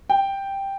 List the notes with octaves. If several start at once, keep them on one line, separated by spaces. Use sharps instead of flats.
G5